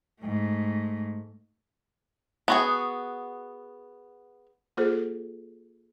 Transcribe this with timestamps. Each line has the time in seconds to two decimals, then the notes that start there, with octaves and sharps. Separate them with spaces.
0.21 G#2 A3
2.48 B3 F#4 G#4
4.77 A#3 F4 G#4 A4 C5